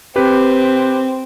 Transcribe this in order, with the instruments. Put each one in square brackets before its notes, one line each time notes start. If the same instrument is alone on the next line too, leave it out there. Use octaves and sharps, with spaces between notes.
[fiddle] C4 [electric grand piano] G4 B4